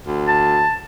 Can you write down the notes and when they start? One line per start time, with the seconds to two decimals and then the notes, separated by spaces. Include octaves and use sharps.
0.07 D2
0.28 A5